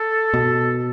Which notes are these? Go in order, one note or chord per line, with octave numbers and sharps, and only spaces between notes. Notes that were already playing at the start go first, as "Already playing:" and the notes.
Already playing: A4
B2